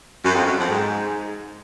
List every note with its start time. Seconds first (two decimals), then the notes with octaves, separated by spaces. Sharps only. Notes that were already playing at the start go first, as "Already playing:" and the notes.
0.23 F#2
0.35 F2
0.46 F#2
0.58 F2
0.69 G#2